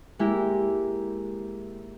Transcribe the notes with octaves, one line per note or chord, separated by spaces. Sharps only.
G#3 A#3 E4 G4